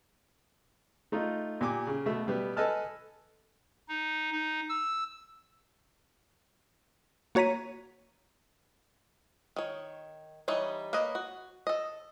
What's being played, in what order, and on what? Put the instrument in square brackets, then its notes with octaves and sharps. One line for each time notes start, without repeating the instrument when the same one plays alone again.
[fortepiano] A3 D#4 F4
A#2 G4 G#5 D6
C#3
B2 A3 E5
B2 G3 B3
A4 B4 D#5 G#5 A5 F6
[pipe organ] D#4
D#4
E6
[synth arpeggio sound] A#3 F#4 C#5 A#5 B6 D#7
[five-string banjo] D#3 C#5
E3 G3 D#4 C#5
A#3 B4 C#5 D#5
F#4
A4 D#5